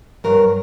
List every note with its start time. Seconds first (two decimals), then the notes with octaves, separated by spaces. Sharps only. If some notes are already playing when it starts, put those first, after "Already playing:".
0.24 G2 F#3 A#4